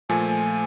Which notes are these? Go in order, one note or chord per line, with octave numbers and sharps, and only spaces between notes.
A#2 F3 A3 G#5